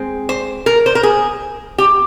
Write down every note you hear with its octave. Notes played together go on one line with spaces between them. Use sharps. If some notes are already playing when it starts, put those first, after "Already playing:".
Already playing: G#3 C4
C5
A#4
C5
A#4
G#4
G4